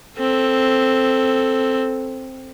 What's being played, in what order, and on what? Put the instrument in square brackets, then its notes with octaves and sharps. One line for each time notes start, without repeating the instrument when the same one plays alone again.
[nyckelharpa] C4 A4